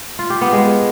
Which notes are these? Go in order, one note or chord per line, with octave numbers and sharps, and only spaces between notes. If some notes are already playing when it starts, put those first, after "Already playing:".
F4
G4
B3
G#3